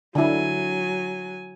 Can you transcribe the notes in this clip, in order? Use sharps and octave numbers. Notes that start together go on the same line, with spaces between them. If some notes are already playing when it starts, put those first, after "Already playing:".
D3 F#3 E4 G#5